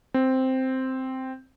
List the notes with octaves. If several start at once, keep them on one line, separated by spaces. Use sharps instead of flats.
C4